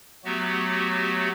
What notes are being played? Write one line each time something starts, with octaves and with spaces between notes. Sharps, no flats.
F#3 A3 B3 F#4 G4